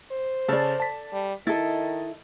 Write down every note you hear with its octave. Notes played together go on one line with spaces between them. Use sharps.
C5
C#3 A4 D5 A5
A5 B6
G3
D#3 E4 A4 D#5 A6